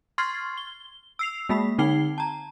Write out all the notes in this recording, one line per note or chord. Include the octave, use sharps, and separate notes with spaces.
C6 C#6 F6 G#6 A6 C7
G7
E6 C7 F7
G#3 A#3 B5 B6
D3 C4 D#4 G5 C7 G7
A5 A#5